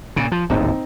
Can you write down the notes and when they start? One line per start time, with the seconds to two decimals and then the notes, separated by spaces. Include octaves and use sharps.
0.16 A#2 C#3
0.32 F3
0.50 D1 G#1 D#2 C4 D#4